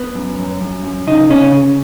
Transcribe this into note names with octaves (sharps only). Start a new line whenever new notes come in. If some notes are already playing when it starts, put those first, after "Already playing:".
Already playing: B3
F#2
F#2
F#2
F#2
C#3 D#4
C#3 C#4
C#3